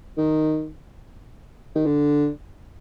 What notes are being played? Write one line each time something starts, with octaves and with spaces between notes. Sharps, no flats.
D#3
D#3
D3